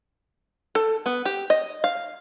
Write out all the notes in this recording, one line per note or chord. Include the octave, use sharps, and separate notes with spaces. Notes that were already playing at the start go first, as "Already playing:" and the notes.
A4
B3
G4
D#5
F5